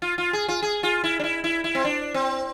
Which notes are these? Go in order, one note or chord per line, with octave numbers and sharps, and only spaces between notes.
F4
F4
G#4
F4
G#4
F4
E4
D4
E4
E4
E4
C4
D4
C4